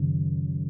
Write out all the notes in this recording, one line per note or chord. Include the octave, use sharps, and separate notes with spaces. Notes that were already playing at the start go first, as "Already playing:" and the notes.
Already playing: F#1 F#2 D#3